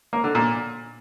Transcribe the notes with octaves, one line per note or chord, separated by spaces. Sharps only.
A#3
D3
A#2